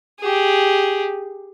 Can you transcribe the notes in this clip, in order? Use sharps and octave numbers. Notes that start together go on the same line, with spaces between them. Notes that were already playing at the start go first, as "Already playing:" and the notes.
G4 G#4